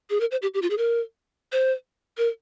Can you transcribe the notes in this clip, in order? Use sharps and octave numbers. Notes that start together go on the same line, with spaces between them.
G#4
A#4
C5
G4
G4
F4
G#4
A#4
C5
A#4